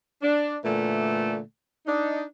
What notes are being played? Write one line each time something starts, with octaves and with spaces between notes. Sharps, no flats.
D4
A#2 D3 E3 A3
D4 D#4